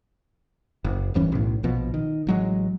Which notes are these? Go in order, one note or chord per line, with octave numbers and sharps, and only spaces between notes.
F#1
D1 G2 E3 C#4
B1 A2
A#1 B2 F3
D#3
A1 F#3 G#3